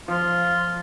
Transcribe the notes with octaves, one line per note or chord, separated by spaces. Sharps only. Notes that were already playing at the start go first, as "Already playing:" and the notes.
F3 F4